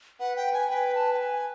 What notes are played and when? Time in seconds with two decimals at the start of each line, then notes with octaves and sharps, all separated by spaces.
0.20 B4 F#5
0.36 G5
0.53 G#5
0.70 B4 G5
0.95 A5
1.13 G5
1.20 G#5